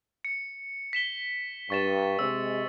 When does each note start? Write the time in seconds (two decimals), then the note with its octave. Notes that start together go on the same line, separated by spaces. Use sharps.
0.25 C#7
0.93 B6 E7 G7
1.70 G2 C#6 A6 E7
2.19 C3 G#3 E6